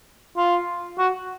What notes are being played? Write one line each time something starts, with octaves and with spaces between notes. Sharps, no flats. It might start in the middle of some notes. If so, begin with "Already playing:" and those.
F4
F#4